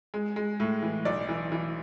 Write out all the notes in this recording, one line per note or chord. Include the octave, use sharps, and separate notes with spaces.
G#3
G#3
A2
E3
B1 D5
E3
E3